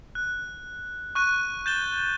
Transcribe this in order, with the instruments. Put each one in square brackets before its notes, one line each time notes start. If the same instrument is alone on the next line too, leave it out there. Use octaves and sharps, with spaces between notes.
[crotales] F#6
C#6 F#6 D#7
G6 A6 E7 G7